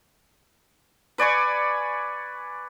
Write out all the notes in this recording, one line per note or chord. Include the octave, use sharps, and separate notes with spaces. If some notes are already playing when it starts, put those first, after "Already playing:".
B4 D5 G#5 C#6